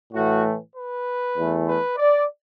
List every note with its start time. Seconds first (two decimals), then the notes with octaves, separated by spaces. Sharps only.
0.13 A2 E3 A3 F#4
0.74 B4
1.36 E2 E3 A3
1.66 B4
1.97 D5